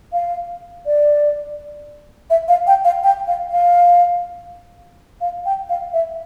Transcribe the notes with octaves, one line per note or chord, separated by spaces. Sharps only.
F5
D5
E5
F5
G5
F5
G5
F5
F5
F5
G5
F5
E5